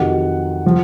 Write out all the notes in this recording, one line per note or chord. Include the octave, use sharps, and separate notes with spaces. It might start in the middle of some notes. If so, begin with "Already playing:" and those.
Already playing: F2 C3 D#3 F#3 F#5
F3